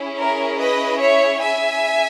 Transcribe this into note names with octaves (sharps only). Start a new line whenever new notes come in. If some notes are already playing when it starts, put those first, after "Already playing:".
Already playing: C#4 E4 G#4
A#4 C#5
B4 D#5
C#5 E5
E5 G#5